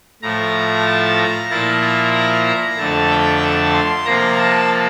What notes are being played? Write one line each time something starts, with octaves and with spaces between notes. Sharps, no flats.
A2 F3 A3 A#5
A5
A#5
A#2 F3 A#3 E4 A5
A#5
A#5
A#5
F2 D3 A3 A5
G5
A5
C6
C3 F3 A#3 A#5
A5